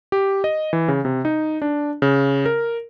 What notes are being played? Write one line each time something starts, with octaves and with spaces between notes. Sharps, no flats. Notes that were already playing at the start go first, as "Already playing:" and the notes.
G4
D#5
E3
C#3
C3
D#4
D4
C#3
A#4